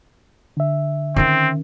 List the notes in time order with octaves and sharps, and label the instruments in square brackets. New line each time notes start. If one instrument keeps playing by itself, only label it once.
[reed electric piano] D3 E5
[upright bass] D#3 C#4 [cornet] C4